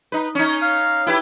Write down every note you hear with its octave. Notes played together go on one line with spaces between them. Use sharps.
D#4 B4
C#4 D#4
F5
E4 G4 B4